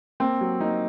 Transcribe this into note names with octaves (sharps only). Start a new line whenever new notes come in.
A#3 C4
F#3
A#3 D#4